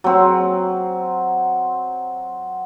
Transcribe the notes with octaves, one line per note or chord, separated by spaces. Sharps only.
F#3 C4